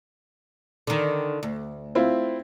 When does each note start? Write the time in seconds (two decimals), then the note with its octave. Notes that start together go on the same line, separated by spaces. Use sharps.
0.87 D3 D#3
1.43 D2
1.95 C4 E4 F4